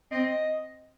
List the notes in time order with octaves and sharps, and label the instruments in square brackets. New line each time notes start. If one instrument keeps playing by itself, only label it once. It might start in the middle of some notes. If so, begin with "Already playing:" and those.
[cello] C4 [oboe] D#5